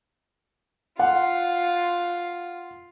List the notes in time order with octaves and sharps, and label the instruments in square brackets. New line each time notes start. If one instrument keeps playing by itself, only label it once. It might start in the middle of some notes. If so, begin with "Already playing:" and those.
[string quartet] F4 [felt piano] F#5